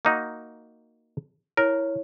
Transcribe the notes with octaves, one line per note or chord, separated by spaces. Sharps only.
A#3 D#4 F#4
E4 A#4 C#5